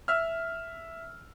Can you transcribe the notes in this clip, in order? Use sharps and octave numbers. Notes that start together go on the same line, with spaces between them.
E5 E6 F6